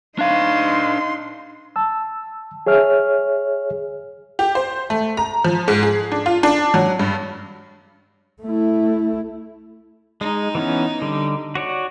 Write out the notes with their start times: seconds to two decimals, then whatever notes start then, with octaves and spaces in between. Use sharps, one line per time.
0.19 D4 D#4 F5 C6
1.76 A5 E6
2.67 G#4 C#5 E5 F6
4.39 G4
4.55 C5
4.90 A3
5.17 A#5
5.44 F3
5.68 G#2
5.83 G#4
6.12 D4
6.26 F4
6.43 D4
6.74 F#3
6.99 G2
8.42 A3 E4
10.21 G#3 D#4
10.55 E3 B3 C#4
11.02 D3 G3
11.55 F#4 C#5 D5